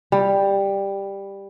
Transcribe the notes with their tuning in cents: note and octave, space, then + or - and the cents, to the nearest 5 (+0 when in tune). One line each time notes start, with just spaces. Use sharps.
G3 +10